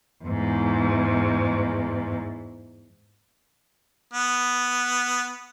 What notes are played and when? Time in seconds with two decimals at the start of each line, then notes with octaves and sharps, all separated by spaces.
0.24 E2 G#2
4.13 B3